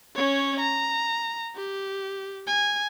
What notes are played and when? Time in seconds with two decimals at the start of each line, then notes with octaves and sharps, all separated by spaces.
0.15 C#4 C#5
0.60 A#5
1.56 G4
2.47 G#5